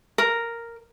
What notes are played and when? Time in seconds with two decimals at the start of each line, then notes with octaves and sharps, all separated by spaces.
0.18 A#4